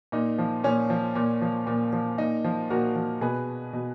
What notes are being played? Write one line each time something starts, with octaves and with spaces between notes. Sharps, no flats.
A#2 D#4
F3
A#2 C#4
F3
A#2
F3
A#2
F3
A#2 D#4
F3
A#2 F#4 A#4
F3
B2 G#4 B4
B2